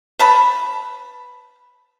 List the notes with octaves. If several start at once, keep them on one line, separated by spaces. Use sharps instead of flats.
B4 A5 B5